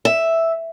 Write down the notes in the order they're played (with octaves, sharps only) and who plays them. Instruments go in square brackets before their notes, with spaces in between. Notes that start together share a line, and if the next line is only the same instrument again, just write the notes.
[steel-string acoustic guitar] E5